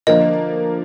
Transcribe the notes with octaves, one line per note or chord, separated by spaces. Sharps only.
D3 F3 A#3 D#5